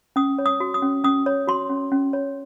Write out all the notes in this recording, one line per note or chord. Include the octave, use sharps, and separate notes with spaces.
C#4 D#6
C#5
D#6
F#4
D#6
C#4
C#4 D#6
C#5
F#4 C6
C#4
C#4
C#5